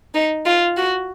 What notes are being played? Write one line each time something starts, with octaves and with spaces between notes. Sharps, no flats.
D#4
F4
F#4